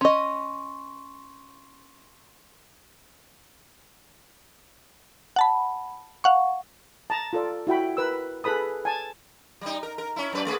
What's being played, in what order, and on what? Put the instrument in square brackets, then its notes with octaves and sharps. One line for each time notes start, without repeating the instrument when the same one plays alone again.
[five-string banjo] C#4 D#5 [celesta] C6 C#6
[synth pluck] F#5 A5 B5
F5 F#5 C#6
[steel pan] A5 A#5
F4 A4 D5
E4 F#4 G5 B5
A#4 B4 E6
G#4 A4 B4 B5 D#6
G#5 A5
[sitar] G3 D#4
A#4
A#4
C#4 E4
F#2 B4 D5
A3 G#4 B4